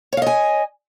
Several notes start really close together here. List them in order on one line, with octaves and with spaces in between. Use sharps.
C#5 F5 D#5 G#5